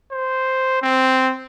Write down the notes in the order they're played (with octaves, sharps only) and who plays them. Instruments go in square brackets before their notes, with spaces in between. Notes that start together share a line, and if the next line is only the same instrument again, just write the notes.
[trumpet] C5
C4